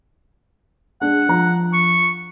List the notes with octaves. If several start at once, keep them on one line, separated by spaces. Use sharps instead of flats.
G#3 D4 F#5
F3 A#5
C#6